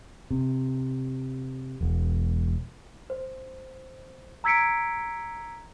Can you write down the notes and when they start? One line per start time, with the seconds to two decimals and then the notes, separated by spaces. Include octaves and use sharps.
0.30 C3
1.81 E1
3.10 C5
4.44 A#5 E6 G#6 B6 C#7 D7